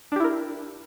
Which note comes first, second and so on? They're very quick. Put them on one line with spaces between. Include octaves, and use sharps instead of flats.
D4 G4 E4 A#4